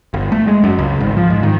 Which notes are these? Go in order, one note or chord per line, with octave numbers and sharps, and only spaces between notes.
G1
A3
G#3
F#2
C#2
G#1
F3
G#2
D#3